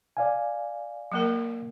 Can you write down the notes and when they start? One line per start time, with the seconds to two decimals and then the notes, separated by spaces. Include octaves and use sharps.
0.17 D5 F5 G#5
1.12 F#3 A#3 A#4